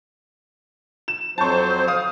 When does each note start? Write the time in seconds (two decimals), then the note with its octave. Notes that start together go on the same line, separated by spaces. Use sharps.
1.08 E7
1.38 F2 F#3 C5 A5 C#6
1.87 F5 D#6